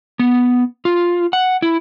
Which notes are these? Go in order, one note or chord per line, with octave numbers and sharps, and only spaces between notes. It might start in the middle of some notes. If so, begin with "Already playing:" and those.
B3
F4
F#5
E4